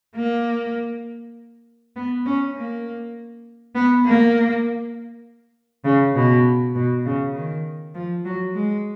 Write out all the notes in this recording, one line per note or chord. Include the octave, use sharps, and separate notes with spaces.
A#3
B3
C#4
A#3
B3
A#3
C#3
B2
B2
C#3
D#3
F3
F#3
G#3